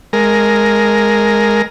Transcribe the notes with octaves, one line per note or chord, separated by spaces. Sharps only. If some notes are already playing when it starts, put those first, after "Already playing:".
G#3 A#4